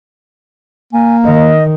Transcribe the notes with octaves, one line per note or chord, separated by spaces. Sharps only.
A#3 G#5
D#3 D#5